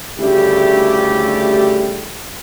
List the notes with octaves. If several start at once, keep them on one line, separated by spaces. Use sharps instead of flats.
D2 C#3 G3 A3 E4 G4